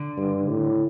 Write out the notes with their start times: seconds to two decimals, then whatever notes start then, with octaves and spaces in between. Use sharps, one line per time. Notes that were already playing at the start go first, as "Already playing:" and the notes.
Already playing: D3
0.17 G2
0.49 A2